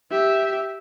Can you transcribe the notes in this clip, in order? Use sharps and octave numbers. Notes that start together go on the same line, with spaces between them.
G4 E5